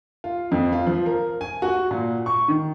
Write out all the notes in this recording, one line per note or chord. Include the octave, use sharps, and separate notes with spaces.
F4
F2
F4
F3
A#4
G#5
F#4
A#2
C#6
D#3